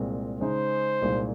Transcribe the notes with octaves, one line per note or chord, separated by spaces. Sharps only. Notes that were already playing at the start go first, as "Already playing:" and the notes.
Already playing: C2 A#2 G#3 C4
C#3 G#3 D#4 C5
C2 A#2 G#3 D#4